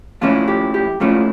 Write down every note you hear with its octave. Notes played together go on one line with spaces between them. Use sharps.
A#2 F3 A3 C#4 E4 F4
G4
G4
A#2 F3 A3 C#4 E4 F4